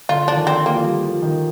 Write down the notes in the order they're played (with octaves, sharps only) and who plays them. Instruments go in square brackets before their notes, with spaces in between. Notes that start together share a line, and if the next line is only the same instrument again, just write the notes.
[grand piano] D3 [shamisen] F4
[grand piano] F3 [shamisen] D4
[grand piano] D#3
[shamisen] C4
A#3
[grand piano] F3
G3
F3
D#3